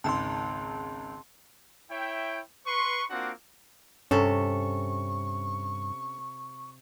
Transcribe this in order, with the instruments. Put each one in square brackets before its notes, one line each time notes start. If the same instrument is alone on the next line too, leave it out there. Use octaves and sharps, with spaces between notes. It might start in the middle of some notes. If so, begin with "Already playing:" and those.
[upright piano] G#1 C#2 [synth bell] A5 C6
[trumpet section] E4 C#5 E5 G5
B4 C6 C#6
A#3 C4 D4 F4 F#4 F#5
[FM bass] G2 [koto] C3 A4 [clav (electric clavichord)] C#4 [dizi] C#6